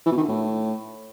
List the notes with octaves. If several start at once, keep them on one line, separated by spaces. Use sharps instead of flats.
E3
B2
D#3
D3
A2